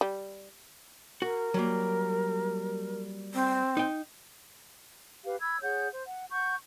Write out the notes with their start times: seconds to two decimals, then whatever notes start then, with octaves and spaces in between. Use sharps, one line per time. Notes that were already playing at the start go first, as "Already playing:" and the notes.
0.01 G3
1.22 F#4 A#4
1.54 F#3 G3 A#3
3.34 C4
3.77 D#4 G5
5.26 G4 B4 F5
5.41 B5 E6 G#6
5.62 G#4 C#5 F#5 G6
5.93 C5
6.06 F#5
6.32 F#5 C#6 G6